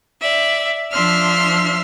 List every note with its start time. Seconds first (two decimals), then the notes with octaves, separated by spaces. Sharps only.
0.21 D5 E5
0.93 F3 D4 E5 C6 F6